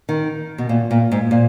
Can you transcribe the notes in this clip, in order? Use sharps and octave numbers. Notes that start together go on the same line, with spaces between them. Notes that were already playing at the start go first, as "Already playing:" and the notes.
D#3
B2
A#2
A#2
G#2
A#2